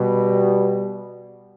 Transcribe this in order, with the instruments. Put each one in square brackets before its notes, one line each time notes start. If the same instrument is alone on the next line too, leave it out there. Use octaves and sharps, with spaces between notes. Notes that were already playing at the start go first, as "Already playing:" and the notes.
Already playing: [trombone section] B2 G3